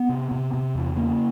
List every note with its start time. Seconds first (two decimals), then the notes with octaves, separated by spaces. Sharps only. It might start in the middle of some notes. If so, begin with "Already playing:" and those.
Already playing: B3
0.09 C3
0.31 C3
0.54 C3
0.75 E2
0.96 C#3 A#3